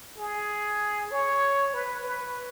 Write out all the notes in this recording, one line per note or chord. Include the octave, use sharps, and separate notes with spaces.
G#4
C#5
B4
B4